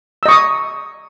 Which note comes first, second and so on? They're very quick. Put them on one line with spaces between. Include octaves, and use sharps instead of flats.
E6 D#5 C#6 D#6